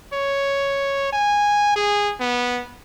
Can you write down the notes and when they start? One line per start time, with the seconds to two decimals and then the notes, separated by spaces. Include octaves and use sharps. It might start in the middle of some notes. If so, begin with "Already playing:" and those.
0.13 C#5
1.13 G#5
1.76 G#4
2.20 B3